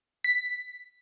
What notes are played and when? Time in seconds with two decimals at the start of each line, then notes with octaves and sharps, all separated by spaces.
0.24 B6